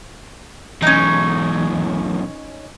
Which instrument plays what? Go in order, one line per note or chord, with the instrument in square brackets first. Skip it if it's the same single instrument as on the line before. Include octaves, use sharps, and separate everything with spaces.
[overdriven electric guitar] B1 E3 [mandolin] C#4 D#4